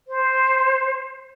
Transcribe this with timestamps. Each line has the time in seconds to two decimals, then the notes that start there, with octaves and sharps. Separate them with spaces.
0.08 C5